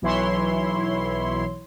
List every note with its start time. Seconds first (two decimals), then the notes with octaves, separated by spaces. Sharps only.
0.02 B1 E3 E4 C#5 C6